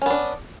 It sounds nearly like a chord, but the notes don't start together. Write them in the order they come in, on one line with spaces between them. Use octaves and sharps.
C#4 B3 D4